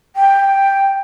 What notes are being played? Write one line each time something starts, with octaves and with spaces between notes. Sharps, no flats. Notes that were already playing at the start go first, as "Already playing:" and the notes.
G5